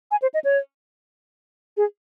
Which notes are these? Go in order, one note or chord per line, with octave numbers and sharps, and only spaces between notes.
G#5
C5
D#5
C#5
G#4